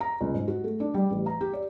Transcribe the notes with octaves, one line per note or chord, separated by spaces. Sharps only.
A#5
C#2
G#2
F#4
A3
D4
G3
A1
A#5
G4
D5